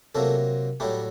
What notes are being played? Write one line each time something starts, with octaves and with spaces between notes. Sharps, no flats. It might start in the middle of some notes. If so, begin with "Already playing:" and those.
C3 F#3 A3 A#3 A4
A2 F#3 G3 A3 G4